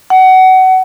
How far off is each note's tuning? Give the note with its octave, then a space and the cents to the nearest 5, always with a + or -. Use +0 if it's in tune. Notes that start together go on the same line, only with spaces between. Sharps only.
F#5 +25